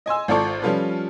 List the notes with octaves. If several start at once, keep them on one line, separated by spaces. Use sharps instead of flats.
D#5 G#5 C6 E6
G#1 F4 A4 D5 A5 C#6
F3 G3 C#4 F4 A4 B4